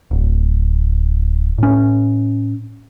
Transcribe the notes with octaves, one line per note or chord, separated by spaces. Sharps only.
D1
A2 C#4